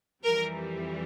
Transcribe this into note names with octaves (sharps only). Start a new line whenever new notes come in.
F2 E3 G3 A#4